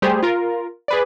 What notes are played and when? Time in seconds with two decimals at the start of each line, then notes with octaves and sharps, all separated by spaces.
0.02 G3 A3 G4 G#4 C5
0.23 F4 A#4
0.88 G#4 B4 D5